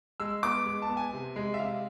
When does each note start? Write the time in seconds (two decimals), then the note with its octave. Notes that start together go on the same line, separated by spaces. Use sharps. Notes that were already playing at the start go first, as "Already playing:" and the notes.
0.20 G#3 E6
0.43 B3 D6
0.66 G#3
0.82 A5
0.89 B3
0.97 G#5
1.13 C3
1.36 G#3
1.54 E5
1.59 C3 F5